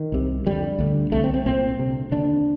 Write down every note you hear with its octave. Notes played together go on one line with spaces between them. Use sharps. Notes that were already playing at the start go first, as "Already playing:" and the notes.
Already playing: D#3
C2 C3
F2 D3 G3
D2 D3
C2 C3 A3
C4
C4
C2 A#2 C4
D2 C3
D#2 D3 D4